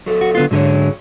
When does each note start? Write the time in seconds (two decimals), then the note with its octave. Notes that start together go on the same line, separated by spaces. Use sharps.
0.06 F#3 A4
0.21 F#4
0.35 D3 B3 F4
0.51 G#2 D3 F#3 G#4 C#5